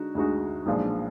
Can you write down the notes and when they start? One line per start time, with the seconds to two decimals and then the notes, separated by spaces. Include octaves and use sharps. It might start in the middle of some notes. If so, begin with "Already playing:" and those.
Already playing: D3 G#3 D#4 F#4
0.15 D2 D3 G#3 D#4 F#4
0.66 B1 A#2 F3 G#3 D4